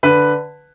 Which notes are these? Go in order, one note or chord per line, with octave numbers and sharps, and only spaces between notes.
D3 B4